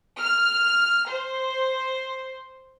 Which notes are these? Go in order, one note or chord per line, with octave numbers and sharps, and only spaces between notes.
F6
C5